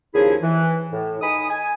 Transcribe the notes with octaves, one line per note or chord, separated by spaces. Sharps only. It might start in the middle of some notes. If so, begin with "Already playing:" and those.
D#2 C#3 F3 E4 G#4
E3
A2
D#4 G#5 B5 D#6
G#5